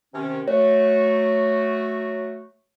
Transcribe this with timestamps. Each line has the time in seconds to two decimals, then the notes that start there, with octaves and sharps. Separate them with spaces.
0.14 C3 D#3 C#4
0.48 F#3 A3 F#4 C#5